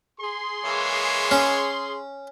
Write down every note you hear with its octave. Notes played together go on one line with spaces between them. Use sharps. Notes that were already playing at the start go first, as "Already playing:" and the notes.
G#4 C6
E3 G#3 A#3 C#5
C#4